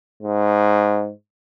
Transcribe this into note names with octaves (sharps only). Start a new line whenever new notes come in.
G#2